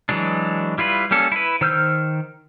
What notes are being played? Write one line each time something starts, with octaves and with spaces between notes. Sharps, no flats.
E3 F#3 G#3 D4
G3 E4 F4 B4
G3 A#3 C#4 A4
E4 B4
D#3 C5 E6 F6 G6